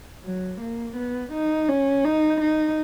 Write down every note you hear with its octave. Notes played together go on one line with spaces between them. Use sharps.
F#3
A#3
B3
D#4
C#4
D#4
D#4